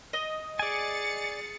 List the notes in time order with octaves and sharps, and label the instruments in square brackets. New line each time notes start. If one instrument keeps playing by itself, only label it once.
[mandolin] D#5
[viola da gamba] G#4 [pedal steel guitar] D5 G#5 [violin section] A6 C#7